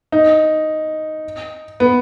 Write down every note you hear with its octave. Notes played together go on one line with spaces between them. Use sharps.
D#4
B3